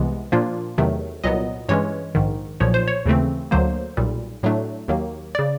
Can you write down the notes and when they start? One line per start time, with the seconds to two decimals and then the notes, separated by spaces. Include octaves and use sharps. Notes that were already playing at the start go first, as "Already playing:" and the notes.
Already playing: C2 C3 E3 G#3 B3
0.32 A#2 F3 A#3 D4 F4
0.78 E2 C3 D#3 F#3 A3
1.24 C2 A#2 F#3 B3 D#5
1.69 G2 E3 G#3 C#4 C#5
2.15 A#1 G#2 D#3
2.60 B1 A#2 F3 C#5
2.74 C5
2.88 C#5
3.06 D#2 C#3 E3 A3 C4
3.51 D2 D3 F#3 A#3 C5
3.97 B1 A#2 G3
4.43 A2 F#3 A3 D4
4.88 D#2 D#3 F#3 A#3
5.35 C#3 D5